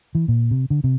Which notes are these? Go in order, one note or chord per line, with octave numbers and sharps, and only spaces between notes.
E3
A#2
C3
D3
C3